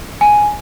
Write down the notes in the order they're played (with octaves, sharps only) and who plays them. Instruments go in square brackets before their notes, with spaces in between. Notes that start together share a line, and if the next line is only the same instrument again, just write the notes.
[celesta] G#5